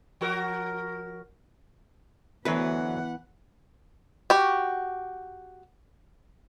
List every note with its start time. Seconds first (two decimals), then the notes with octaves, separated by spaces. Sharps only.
0.21 F3 F#4 A#4
2.45 D2 E3 F#3 B3 B4 F#5
4.30 F#4 G4